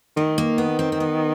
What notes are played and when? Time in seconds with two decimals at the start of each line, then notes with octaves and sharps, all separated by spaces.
0.17 D#3 A3
0.38 A#3
0.58 B3
0.79 C4
0.92 C4
1.00 B3